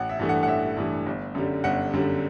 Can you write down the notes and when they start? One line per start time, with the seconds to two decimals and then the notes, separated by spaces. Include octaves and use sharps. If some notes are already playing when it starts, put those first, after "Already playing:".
Already playing: A1 F#5
0.09 E5
0.19 G2 E3 A3
0.29 F#5
0.43 F#5
0.48 A1 E5
0.77 G2 E3 A3
1.06 G1
1.35 F#2 D3 G3
1.64 G1 F#5
1.93 F#2 D3 G3